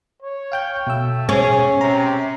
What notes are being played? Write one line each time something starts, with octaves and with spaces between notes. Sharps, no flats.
C#5
F5 G5 G6
B2 A3 E6
C#4 G#4
C3 A#5